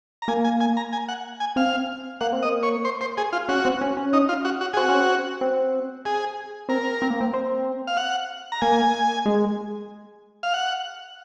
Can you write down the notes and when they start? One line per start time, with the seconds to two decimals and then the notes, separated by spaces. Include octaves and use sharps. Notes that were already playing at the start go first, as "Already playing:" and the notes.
0.22 A#5
0.28 A#3 G#5
0.44 G#5
0.60 G#5
0.77 A#5
0.93 G#5
1.09 F#5
1.40 G#5
1.56 C4 F5
2.21 A#3 F#5
2.33 C4
2.43 A#3 D#5
2.63 C#5
2.85 C5
3.01 C5
3.17 G#4
3.33 F4
3.49 C#4 F#4
3.65 C4
3.81 C#4
3.97 C#4
4.13 D#4
4.29 F4
4.45 F#4
4.61 F#4
4.73 G#4
4.77 C4 F#4
4.88 C#4
5.00 C4
5.41 C4
6.05 G#4
6.69 C4 A#4
7.02 C4
7.10 A#3
7.20 C4
7.34 C4
7.87 F5
7.97 F#5
8.52 A#5
8.62 A#3 G#5
9.26 G#3
10.43 F5
10.54 F#5